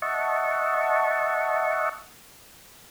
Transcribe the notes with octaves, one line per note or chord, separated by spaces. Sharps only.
D#5 E5 F#5 A5 C#6